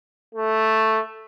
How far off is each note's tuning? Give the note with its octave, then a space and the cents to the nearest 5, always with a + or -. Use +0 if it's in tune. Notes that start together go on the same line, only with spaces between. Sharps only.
A3 +0